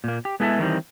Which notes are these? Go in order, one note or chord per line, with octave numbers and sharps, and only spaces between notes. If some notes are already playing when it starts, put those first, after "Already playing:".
A#2 A#3
G4
G#3 B3 E4 G#4 A4 E5
D#3 E3 G3 C4